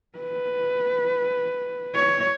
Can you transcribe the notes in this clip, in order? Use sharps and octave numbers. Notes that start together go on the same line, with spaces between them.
B4
C#5